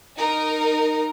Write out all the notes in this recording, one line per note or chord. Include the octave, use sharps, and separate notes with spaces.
D#4 A#4